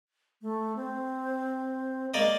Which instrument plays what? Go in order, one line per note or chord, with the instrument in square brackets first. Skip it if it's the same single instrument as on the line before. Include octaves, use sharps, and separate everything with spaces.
[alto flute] A3
C4
[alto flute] G#3 [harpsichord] A#3 D5 D#5